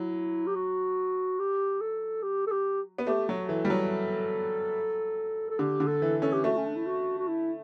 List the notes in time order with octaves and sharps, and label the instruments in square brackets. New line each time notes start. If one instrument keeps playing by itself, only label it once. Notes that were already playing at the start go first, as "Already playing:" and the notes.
Already playing: [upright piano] F#3 [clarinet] E4
[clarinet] G4
F#4
G4
A4
G4
A4
G4
[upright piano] B3
[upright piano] A3 [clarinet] G4
[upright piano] F#3 [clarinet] F#4
[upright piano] E3 [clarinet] A4
[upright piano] G3
[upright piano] F#3 [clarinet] A4
[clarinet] A4
[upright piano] D3 [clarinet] G4
[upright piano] D3
[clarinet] A4
[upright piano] E3
[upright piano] C#4 [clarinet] A4
[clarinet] G4
[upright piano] A3 [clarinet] F#4
[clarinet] C#4
D4
E4
F#4
F#4
E4